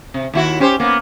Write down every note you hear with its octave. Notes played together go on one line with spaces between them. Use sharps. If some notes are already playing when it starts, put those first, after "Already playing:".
C3
D#2 E4 F#4
C#4 G4 C5
A#3 B3